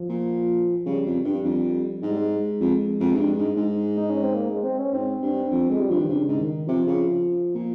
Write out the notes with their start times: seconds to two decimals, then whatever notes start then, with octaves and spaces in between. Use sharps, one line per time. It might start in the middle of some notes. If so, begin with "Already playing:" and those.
Already playing: F3
0.09 A#2
0.86 C#3 G3
1.06 F2
1.25 G2
1.44 F2
2.02 G#2 G#3
2.11 G3
2.19 G#3
2.61 F2
3.00 F2
3.14 G#2
3.18 G2
3.38 G#2
3.57 G#2
3.97 D#4
4.10 C#4
4.23 C4
4.35 A#3
4.49 G#3
4.63 C4
4.79 C#4
4.93 G#2 C4
5.22 G2
5.52 F2
5.70 F2 G#3
5.80 G3
5.90 G2 F3
6.00 D#3
6.09 G2 C#3
6.28 G#2
6.38 D#3
6.67 C3 F3
6.87 C#3
7.55 A#2